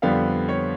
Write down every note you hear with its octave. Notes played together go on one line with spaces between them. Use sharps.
F2 D3 G3 B3 F5
C#5